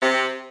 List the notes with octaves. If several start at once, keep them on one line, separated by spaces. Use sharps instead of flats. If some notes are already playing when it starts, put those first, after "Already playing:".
C3